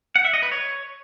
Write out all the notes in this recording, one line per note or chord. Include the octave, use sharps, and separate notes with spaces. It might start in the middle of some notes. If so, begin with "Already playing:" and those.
F#5
E5
D#5
B4
C#5